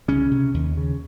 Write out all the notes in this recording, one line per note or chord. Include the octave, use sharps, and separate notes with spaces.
C2 C#3 C#4
C3
D#2
C#3